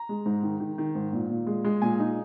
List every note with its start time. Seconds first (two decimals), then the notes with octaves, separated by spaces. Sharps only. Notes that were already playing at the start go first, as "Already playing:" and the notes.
Already playing: A#5
0.09 G#3
0.26 G#2
0.43 D#3
0.60 D#3
0.78 D#3
0.95 G#2
1.13 A#2
1.30 A#2
1.47 G#3
1.64 G#3
1.82 A#2 G#5
1.99 D#4